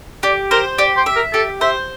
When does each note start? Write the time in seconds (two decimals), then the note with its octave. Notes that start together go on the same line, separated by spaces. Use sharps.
0.23 G4 D5
0.51 A#4 C5
0.79 G4 D5
0.97 C5
1.06 E5
1.16 A#4
1.34 G4 A4
1.61 C5 E5